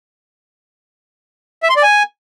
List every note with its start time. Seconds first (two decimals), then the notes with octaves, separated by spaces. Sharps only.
1.63 E5
1.70 C6
1.76 D5
1.83 G#5